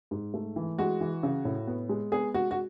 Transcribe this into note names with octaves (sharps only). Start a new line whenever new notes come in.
G#2
A3
E3
G#3 F#4
E3
C#3
A2
B3
G#3
B3 G#4
G#3 F#4
F#4